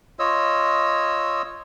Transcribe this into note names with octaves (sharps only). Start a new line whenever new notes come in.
F4 C#5 D#5 E6